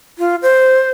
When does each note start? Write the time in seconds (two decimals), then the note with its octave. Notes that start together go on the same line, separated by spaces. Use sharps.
0.19 F4
0.42 C5